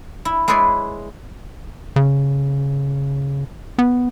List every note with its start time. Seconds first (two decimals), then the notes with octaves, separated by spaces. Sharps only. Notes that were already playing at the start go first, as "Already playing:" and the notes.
0.25 E4
0.48 G#3 E4 G#4 B4 C#5 D5
1.96 C#3
3.78 B3